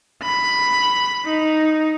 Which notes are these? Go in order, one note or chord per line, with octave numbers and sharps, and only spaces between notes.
B5
D#4